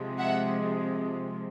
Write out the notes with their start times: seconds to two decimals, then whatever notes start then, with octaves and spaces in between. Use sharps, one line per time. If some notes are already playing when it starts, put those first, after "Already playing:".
Already playing: C3 F3 G#3
0.19 E5 F#5